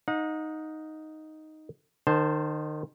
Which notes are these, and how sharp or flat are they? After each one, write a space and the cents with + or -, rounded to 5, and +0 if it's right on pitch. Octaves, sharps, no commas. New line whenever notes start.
D#4 +0 F#5 -40
D#3 -30 C5 +0 A5 +0